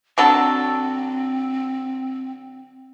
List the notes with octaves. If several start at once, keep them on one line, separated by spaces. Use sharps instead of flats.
D3 F#3 C4 A4